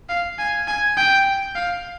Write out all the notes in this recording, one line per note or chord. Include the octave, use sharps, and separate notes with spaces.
F5
G#5
G#5
G5
F5